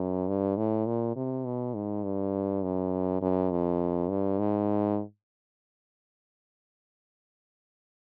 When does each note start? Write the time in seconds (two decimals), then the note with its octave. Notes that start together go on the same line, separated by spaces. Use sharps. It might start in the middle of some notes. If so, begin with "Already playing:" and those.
Already playing: F#2
0.28 G2
0.57 A2
0.87 A#2
1.16 C3
1.45 B2
1.75 G#2
2.04 G2
2.63 F#2
3.22 F#2
3.51 F2
4.10 G2
4.39 G#2